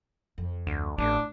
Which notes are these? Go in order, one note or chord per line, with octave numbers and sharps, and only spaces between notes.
F2
D2
A1 A2 D4